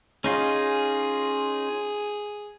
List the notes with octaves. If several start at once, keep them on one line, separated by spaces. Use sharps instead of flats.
C#4 D#4 F4 G#4